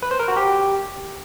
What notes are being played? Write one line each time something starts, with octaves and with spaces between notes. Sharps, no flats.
B4
C5
A#4
F#4
G4